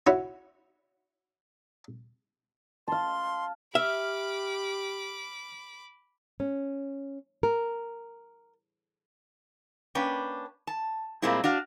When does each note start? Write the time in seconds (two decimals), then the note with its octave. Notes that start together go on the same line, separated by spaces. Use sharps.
0.07 E4 F#4 C#5
2.88 F5 A5 C6
3.75 G4 E5 B5 D6 F6
6.40 C#4
7.43 A#4
9.95 A#3 C#4 D4 B4 G5
10.67 A5
11.22 A#2 G3 G#3 A#3 C4 E4
11.44 D4 F#4 F5